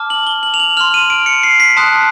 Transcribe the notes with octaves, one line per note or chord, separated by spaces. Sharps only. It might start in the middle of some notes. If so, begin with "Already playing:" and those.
Already playing: A5 D6 F6
F#7
G7
F#7
F7
F#7
C6 F6 F7
D#7
D7
C#7
C7
B6
A5 C6 D#6 F#6